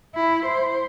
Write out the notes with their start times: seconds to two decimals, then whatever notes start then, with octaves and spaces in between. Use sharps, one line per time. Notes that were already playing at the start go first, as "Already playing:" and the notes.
0.15 E4
0.45 C5